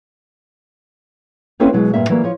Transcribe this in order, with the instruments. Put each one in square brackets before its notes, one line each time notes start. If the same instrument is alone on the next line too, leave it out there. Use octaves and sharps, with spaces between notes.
[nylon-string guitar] A#3 C4 C#4 E4 A4 B4
B2 F#3 G#3
G2 A#2 D#3 G#3 A#3 E5
E3 F#3 G3 A#3
F3 C#5